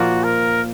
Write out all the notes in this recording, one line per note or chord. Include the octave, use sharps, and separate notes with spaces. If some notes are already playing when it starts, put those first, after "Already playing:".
Already playing: A#2 F3 A#3 F4 F#4
A#4